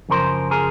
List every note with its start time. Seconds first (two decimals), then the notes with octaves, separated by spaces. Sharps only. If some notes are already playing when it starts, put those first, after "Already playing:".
0.09 F#2 C#3 F3 A#4 C5
0.51 G#4 A#4